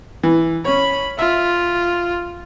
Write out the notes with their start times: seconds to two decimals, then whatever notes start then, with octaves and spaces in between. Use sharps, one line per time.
0.23 E3
0.65 C#4 C#5 B5
1.19 F4 E5